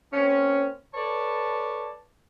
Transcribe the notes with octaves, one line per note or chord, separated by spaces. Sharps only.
A#3 C4 C#4
A4 B4 C#5 D5 A5